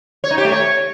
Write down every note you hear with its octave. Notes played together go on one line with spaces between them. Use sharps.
C#5
D#4
G4
A3
C#5